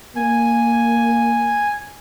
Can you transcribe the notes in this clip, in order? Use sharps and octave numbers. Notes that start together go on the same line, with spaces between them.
A#3 G#5